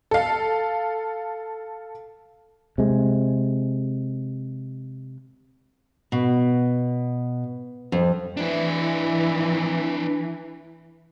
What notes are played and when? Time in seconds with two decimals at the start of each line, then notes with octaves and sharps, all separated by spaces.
0.11 A4 F5
2.78 C3 G#3
6.12 B2
7.92 F2
8.37 E3 D4 E4